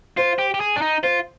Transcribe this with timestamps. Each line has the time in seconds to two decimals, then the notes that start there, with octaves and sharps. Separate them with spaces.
0.17 F4 C5
0.39 G4
0.54 G4
0.60 G#4
0.76 D4
0.82 D#4
1.03 F4 C5